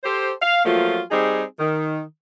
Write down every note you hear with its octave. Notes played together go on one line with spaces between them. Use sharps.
G4 A4 C5
F5
F3 F#3 A3 A#3 F4
G3 C4 D#4 G#4
D#3